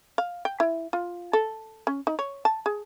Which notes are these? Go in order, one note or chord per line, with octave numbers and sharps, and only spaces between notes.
F5
G5
E4
F4
A4
C#4
D#4
C#5
A5
G#4